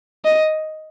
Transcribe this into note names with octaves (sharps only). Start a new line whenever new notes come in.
D#5